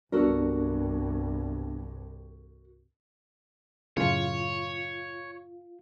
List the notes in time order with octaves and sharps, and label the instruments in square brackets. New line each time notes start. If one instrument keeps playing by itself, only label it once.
[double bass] C2 G2 [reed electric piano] G3 B3 D4 [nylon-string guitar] F#4 A4 A#4
[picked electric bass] F#2 A2 C#3 [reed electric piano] F4 [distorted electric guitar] C#5